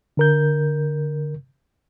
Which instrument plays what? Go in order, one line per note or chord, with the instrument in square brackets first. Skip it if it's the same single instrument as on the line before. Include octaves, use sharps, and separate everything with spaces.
[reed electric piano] D3 A#4 G6